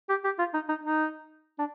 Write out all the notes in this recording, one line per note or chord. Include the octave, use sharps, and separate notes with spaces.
G4
G4
F4
D#4
D#4
D#4
D4